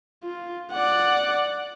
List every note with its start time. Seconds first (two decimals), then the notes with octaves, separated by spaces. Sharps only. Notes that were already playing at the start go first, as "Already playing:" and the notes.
0.24 F4
0.72 D5 F#5